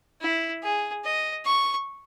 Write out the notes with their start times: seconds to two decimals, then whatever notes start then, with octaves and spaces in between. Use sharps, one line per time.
0.21 E4
0.63 G#4
1.04 D#5
1.45 C#6